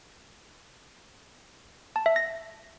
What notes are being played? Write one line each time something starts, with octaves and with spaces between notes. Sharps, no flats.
A5
E5
A#6